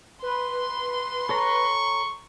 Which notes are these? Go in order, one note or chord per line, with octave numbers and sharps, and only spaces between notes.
B4 C6
A4 C#5 A#5 C#6